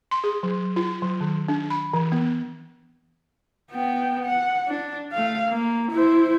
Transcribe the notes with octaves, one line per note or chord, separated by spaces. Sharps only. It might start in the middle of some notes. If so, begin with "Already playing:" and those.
C6
G#4
F#3
F4
F#3
D#3
D4
B5
E3
B3
B3 G5
F#5
D4
A3 F5
A#3
E4 C5